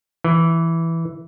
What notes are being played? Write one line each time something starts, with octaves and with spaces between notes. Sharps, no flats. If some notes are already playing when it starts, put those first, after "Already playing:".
E3